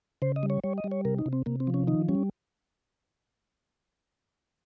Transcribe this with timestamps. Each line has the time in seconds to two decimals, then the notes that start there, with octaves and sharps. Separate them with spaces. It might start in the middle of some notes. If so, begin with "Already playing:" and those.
0.22 C#3 C5
0.36 D#5
0.43 G3
0.50 C#5
0.64 G3 C#5
0.78 D#5
0.84 G3
0.92 C#5
1.05 C3 A#4
1.19 D#4
1.26 C3
1.33 C4
1.46 C3 A#3
1.60 C4
1.67 F3
1.74 C#4
1.87 D#3 D#4
2.09 G3 C#4